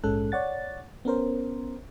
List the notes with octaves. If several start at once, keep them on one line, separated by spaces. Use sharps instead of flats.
A#1 G#2 G#3 C#4 A4 F#6
C#5 D5 F#5 A6
B3 C#4 A#4 C5